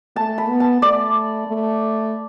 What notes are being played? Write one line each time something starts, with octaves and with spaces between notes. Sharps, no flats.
A3 A5
B5
B3
A5
A3 D5
A3